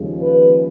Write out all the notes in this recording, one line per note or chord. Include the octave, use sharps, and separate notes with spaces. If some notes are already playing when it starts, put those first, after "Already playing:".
Already playing: D#2 C#3 F3 G#3
B4